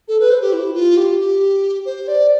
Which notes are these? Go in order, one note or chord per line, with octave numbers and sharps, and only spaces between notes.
A4
B4
C5
G4
E4
F4
G4
G4
C5
D5